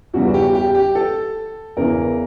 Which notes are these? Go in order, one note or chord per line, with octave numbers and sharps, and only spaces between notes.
E2 C#3 E3 G3 F#4
F#4
G4
G4
G4
A4
E2 C#3 E3 A#4